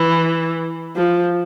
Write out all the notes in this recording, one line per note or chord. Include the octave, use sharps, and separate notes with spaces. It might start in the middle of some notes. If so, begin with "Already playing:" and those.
Already playing: E3
F3